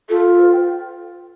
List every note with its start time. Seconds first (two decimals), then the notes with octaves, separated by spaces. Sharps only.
0.09 F4 A4
0.38 C5
0.52 G5